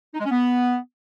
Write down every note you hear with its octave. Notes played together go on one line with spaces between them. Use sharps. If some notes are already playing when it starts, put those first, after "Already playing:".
D#4
G#3
C#4
B3